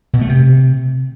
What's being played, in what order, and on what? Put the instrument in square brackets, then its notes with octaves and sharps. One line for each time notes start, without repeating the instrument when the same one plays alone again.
[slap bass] B2
A3
C3